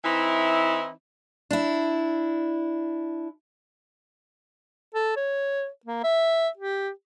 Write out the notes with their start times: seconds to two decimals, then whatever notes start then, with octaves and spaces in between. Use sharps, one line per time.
0.04 E3 C4 D#4 E4
1.51 D4 E4
4.94 A4
5.16 C#5
5.85 A#3
6.04 E5
6.57 G4